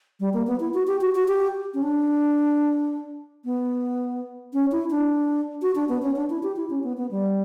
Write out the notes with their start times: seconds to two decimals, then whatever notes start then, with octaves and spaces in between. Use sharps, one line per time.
0.20 G3
0.33 A#3
0.47 B3
0.60 E4
0.74 F#4
0.87 G4
1.01 F#4
1.15 F#4
1.28 G4
1.74 C#4
1.83 D4
3.45 B3
4.53 C#4
4.72 E4
4.90 D4
5.62 F#4
5.75 D4
5.89 B3
6.02 C#4
6.16 D4
6.30 E4
6.43 G4
6.56 E4
6.70 C#4
6.84 B3
6.97 B3
7.11 G3